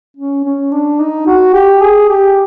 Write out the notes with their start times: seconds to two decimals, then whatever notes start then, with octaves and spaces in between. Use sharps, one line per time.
0.17 C#4
0.44 C#4
0.71 D4
1.00 D#4
1.26 F#4
1.53 G4
1.81 G#4
2.09 G4